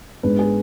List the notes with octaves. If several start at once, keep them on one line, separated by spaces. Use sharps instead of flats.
G#2 G#3 B3 D4 B4
G#4